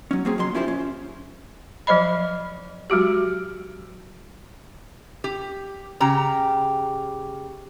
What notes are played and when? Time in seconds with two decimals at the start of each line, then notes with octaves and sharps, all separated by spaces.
0.11 F#3 C#4
0.25 F#3 A#3 C4 C#4 G#4
0.38 F2 C#3 F#3 C6
0.55 C#4 E4 F4 G4 A#4 C5
0.68 C#4
1.87 F3 F#3 C5 D#5 B5
2.90 F#3 G#3 F#4 G4
5.24 G4
6.00 C#3 G4 A#5